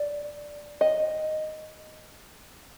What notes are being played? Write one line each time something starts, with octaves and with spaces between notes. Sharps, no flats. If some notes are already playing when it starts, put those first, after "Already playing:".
Already playing: D5
D#5